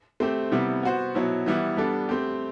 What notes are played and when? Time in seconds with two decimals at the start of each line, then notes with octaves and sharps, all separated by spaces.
0.20 A3 C4 G4 C5
0.51 C3 G3 B3 E4
0.83 B3 F#4 C5
1.15 B2 F#3 B3 E4
1.46 E3 G3 B3 E4
1.77 G3 B3 D4 A4
2.09 A3 C4 G4